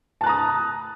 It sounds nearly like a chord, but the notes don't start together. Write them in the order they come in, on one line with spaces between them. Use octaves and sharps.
A5 F#6 A#5 D#6